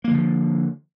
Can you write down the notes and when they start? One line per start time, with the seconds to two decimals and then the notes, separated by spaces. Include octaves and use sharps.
0.04 A#3
0.08 E3
0.11 D3
0.14 F3